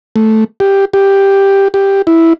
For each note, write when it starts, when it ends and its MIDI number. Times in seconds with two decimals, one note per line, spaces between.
0.16 0.44 57
0.60 0.85 67
0.93 1.68 67
1.74 2.02 67
2.07 2.33 64